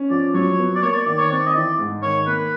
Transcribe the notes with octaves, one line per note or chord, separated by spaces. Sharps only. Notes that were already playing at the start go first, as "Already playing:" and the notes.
Already playing: C#4
F3 D5
F#3 C#5
B3
D5
A#3 C#5
D5
D#3 D5
C#5
C4 D5
D#5
E3 D5
G#2
D#3 C#5
A#3 B4